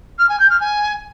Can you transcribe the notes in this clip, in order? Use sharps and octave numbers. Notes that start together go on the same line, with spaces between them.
F6
G#5
G6
F6
G#5